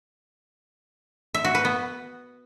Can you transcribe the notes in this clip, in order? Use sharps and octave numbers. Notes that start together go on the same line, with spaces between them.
E5
F#4
B4
B3